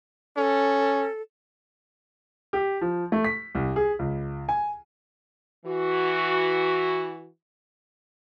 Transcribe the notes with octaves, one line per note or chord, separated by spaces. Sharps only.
C#4 A4
G4
F3
A3
B6
C2
G#4
C#2
G#5
E3 F#4